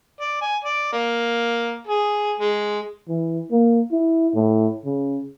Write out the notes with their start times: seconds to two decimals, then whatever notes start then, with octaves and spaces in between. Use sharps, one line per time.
0.20 D5
0.42 G#5
0.64 D5
0.93 A#3
1.87 G#4
2.40 G#3
3.09 E3
3.52 A#3
3.92 E4
4.35 A2
4.85 C#3